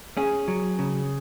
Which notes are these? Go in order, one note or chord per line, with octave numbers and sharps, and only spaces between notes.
C#4 G#4
F#3
C#3